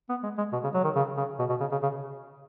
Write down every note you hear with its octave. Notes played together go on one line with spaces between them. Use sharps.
B3
G#3
G#3
B2
C#3
F#3
D#3
C#3
C#3
B2
B2
C#3
C#3
C#3